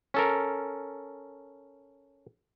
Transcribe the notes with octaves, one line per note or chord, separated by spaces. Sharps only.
C#4 A4 A#4